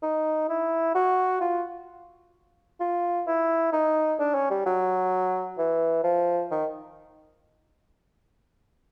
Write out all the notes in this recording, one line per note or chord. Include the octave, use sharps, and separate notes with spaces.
D#4
E4
F#4
F4
F4
E4
D#4
D4
C#4
G3
F#3
E3
F3
D#3